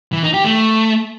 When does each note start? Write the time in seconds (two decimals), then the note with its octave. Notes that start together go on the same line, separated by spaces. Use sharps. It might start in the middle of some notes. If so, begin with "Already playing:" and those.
0.13 E3
0.23 D#4
0.34 G4
0.44 A3